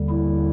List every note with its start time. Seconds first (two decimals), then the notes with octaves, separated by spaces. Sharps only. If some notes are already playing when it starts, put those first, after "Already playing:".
Already playing: D#2 D3 G3
0.09 E4